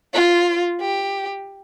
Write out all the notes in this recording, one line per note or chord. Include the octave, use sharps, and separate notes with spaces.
F4
G4